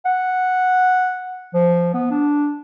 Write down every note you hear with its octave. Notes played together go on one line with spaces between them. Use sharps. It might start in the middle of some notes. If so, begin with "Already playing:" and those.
F#5
F3
B3
D4